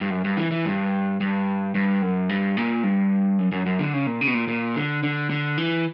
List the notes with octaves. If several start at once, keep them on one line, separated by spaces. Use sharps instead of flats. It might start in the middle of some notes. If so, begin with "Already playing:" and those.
G2
F#2
G2
E3
E3
G2
G2
G2
F#2
G2
A#2
G2
F#2
F#2
F#2
D3
C#3
A#2
C#3
B2
A#2
A#2
D3
D3
D3
E3